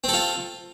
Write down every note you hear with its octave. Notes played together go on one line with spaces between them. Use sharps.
C4 F4 A4